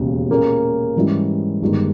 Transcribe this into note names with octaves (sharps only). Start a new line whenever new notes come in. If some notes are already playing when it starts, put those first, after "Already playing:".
Already playing: E1 D#2 C#3
A#2 A#3 C#4 G#4
G#2 E3 G3 C#4 E4
G1 G2 D#3 G#3 D#4